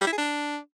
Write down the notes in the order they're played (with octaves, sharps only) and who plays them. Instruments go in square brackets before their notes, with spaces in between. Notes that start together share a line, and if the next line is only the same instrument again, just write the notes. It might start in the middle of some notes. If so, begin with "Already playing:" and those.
[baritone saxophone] G3
E4
G#4
D4